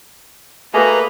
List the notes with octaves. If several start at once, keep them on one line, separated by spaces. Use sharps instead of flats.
A3 A#3 F#4 G#4 B4 D#5 A#5